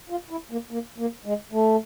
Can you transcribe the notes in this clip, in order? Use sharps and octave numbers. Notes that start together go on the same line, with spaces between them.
F4
E4
A#3
A#3
A#3
G#3
A3